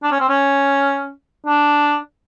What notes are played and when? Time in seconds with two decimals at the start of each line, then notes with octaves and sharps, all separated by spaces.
0.03 D4
0.12 C#4
0.21 C4
0.29 C#4
1.46 D4